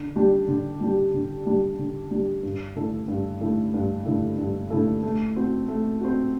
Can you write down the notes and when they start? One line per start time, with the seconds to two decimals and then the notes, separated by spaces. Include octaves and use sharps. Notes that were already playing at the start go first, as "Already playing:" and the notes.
Already playing: D3
0.16 G3 D4 G4
0.48 D3
0.80 G3 D4 G4
1.14 D3
1.46 G3 D4 G4
1.78 D3
2.11 G3 D4 G4
2.43 G2
2.75 D3 A3 E4 A4
3.08 G2
3.41 D3 A3 E4 A4
3.74 G2
4.06 D3 A3 E4 A4
4.38 G2
4.70 D3 A3 E4 A4
5.03 A3
5.36 C4 F#4
5.68 A3
6.00 C4 F#4